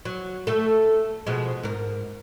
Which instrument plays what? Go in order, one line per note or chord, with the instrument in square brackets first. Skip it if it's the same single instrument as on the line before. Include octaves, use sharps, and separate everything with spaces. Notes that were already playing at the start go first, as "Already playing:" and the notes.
[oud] F#3
A3 A4
B2 F3 G#3
G#2 A#4